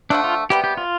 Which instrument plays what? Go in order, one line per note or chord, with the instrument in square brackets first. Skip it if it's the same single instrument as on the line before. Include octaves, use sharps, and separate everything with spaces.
[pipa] D3 F3 A3 [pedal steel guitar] D4
[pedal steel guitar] F4
[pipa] C3 G3 B3 [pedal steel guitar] G4
[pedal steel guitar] G4
F4